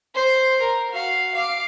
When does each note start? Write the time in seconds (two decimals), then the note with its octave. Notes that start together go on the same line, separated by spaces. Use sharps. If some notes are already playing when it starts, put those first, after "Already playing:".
0.15 C5
0.61 A#4
0.91 F#4 F5
1.34 F5 D6